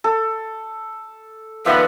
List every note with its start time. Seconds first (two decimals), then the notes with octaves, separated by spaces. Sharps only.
0.04 A4
1.66 D#3 F3 B3 B4 D5 E5